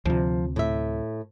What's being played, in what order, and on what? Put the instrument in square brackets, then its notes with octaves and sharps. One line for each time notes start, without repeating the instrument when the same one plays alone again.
[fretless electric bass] D2 C3 [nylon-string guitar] F3
[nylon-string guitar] A2 E5